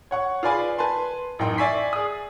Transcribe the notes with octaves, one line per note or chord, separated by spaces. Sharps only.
C#5 F#5 C#6
F4 G#4 B4 D5 G#5 B5
B4 G#5 A5 C6
A1 F#2 D#4 G5 C6
D5 E5 G#5 C#6 B6 C7
G#4 D#6